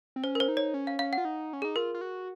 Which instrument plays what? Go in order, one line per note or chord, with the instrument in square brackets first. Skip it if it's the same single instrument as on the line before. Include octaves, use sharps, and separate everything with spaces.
[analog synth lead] C4
[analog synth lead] C#4 [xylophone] C5
[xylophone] A#4
C5
[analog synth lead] D#4
[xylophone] C#5
[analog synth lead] C#4
[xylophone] F5
[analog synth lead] C#4 [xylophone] F5
[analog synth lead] F4 [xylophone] F#5
[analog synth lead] D#4
C#4
[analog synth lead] D#4 [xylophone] G#4
[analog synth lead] F4 [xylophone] A#4
[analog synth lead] F4
F#4